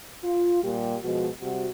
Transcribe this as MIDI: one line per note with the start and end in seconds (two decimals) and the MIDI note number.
0.24 0.61 65
0.63 0.96 46
0.63 0.96 55
0.63 0.96 67
1.04 1.29 47
1.04 1.29 53
1.04 1.29 56
1.04 1.29 66
1.41 1.69 48
1.41 1.69 55
1.41 1.69 66